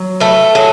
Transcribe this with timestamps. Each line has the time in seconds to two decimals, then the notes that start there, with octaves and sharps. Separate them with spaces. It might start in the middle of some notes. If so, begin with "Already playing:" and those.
Already playing: F#3
0.20 A3 B4
0.55 F#3 G#4